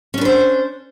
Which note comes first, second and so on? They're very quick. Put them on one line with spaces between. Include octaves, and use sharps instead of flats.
C#4 D4 B4 C5